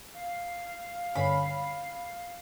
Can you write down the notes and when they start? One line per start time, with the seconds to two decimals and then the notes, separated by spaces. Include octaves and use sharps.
0.14 F5
1.15 G2 D3 C#4 B5